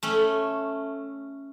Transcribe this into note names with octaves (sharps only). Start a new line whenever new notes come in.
A3 C#4